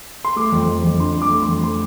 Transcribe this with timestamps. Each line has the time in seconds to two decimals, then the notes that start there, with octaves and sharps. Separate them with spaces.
0.25 C6
0.36 A3 D6
0.52 F2
0.68 F2
0.85 F2
1.00 D3 C6
1.16 F2
1.22 D6
1.31 A3
1.43 C6
1.48 F2
1.64 A3 C6